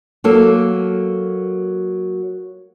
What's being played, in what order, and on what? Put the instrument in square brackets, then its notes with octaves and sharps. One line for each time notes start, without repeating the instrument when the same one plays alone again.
[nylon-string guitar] F#3 A#3 A4